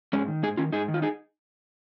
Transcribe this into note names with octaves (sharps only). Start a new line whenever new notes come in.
G#2 G#3 C#4
D#3
G#2 D#4 G#4
D#3 C#4 F4
G#2 D#4 G#4
D#3
F4
D#4 G#4